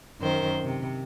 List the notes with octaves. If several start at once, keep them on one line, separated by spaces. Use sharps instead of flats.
F#2 D#3 C5
C3